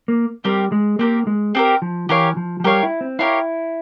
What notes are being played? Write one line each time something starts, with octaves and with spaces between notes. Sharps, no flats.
A#3
G3 C4 G4 A#4
G#3
A#3 C4 G4 A#4
G#3
C4 G4 A#4
F3
E3 G4 A#4 C#5 F5
F3
F3
G3 G4 A#4 C#5 F5
E4
C4
E4 G4 A#4 C#5 F5